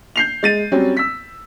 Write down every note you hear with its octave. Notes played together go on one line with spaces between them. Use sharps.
G6 C7 F7
G#3 A6 D#7
F#3 G3 C4 C#4
E6 B6